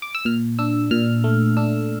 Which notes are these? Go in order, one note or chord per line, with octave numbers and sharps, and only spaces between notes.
D6
E6
A#2 F6
D4 E6
A#2 F6
A3
D4 E6